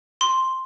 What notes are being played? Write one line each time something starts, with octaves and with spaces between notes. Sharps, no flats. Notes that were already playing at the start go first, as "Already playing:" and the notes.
C6